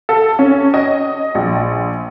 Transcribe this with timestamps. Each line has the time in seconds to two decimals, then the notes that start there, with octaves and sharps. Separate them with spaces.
0.09 A4
0.39 C#4
0.74 D#5
1.35 A#1